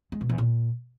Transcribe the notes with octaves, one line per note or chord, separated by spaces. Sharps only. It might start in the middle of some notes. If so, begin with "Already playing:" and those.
G#3
B2
E2
A#2